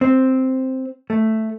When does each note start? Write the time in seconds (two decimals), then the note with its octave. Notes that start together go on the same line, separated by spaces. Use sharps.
0.01 C4
1.10 A3